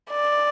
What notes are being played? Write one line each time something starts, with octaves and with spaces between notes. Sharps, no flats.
D5